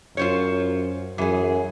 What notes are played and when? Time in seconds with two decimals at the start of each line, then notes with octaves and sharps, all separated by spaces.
0.17 F#2 F4 C5 C#5
1.18 F#2 E3 G#4